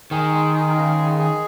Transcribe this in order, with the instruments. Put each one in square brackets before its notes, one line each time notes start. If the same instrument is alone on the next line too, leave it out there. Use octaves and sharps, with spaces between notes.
[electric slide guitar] D#3 [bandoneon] G#4
[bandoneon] G#3
G#4
C#3
G#3
G#4